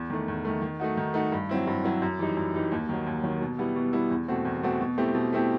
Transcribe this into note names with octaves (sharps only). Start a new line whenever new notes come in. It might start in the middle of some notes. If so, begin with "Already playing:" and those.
Already playing: E2
D#3 A3
E2
D#3 A3
D#3
A3 D#4 F#4
D#3
A3 D#4 F#4
G2
F#3 C4 E4
G2
F#3 C4 E4
F#2
E3 G3 D#4
F#2
E3 G3 D#4
D#2
D#3 F#3
D#2
D#3 F#3
B2
G3 B3 E4
B2
G3 B3 E4
E2
B2 A3 C4 F#4
E2
B2 A3 C4 F#4
B2
A3 C4 E4 G4
B2
A3 C4 E4 G4